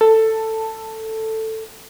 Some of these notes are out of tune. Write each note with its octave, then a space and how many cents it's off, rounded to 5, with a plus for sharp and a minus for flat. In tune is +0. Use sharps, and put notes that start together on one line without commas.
A4 +10